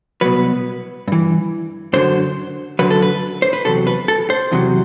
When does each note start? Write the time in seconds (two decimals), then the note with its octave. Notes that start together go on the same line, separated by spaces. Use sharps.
0.21 C2 B2 F#3 B4
1.08 G2 E3
1.93 F#2 D3 F#3 C5
2.79 F#2 D3 F#3 B4
2.90 A4
3.02 B4
3.42 C5
3.53 B4
3.65 E2 C3 F#3 A4
3.87 B4
4.08 A4
4.30 C5
4.52 E2 C3 F#3